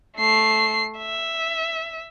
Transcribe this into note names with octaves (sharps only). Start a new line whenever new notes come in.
A3 C7
E5